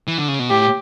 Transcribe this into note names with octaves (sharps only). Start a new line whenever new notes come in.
E3
D3
C#3
B2
A2 G4